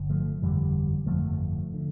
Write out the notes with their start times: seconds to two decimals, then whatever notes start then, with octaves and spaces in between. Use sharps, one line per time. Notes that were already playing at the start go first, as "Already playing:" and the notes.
Already playing: G1 D3
0.10 F3 A3
0.42 G1 F2 D3 E3 G3
1.06 G1 F2 D3 F3 A3
1.74 D3